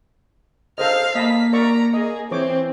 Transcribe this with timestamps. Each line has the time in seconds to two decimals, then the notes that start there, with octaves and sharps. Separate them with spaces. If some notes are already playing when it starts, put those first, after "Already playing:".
0.78 A4 C5 D#5 F5 F6
1.15 A#3 D#5 A5 B5 B6
1.53 A#4 D5 A#5 C#6
1.94 G#4 D#5
2.31 E3 C4 C5 C#5 D6